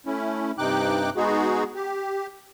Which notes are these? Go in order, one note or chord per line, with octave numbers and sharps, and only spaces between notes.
A3 C#4 E4
G2 C3 D#4 G5 D6 F#6
G#3 B3 D#4 F#4 G#4
G4